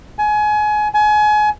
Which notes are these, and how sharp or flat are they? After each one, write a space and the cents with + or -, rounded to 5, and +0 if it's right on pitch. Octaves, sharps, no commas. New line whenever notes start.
G#5 +25
G#5 +30